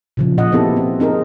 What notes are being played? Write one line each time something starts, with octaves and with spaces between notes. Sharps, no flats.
A#2 C#3 F3
A#2 D#5 F#5
B3 C4 E4 G4 A4
C4
C4 D#4 G#4 A#4